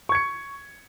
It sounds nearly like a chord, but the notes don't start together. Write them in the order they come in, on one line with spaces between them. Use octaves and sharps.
C#6 G#6 C#7